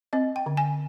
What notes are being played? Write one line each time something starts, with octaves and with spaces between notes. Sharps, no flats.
C4 D#5
G5
D3
G#5